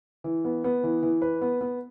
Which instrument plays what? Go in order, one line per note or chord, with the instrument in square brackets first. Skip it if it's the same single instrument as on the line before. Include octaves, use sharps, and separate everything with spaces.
[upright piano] E3
B3
B3
E3
E3
B4
B3
B3